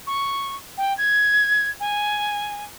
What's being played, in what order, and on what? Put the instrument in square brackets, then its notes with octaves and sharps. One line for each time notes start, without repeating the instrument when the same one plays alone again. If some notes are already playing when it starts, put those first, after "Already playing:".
[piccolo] C#6
G5
G#6
G#5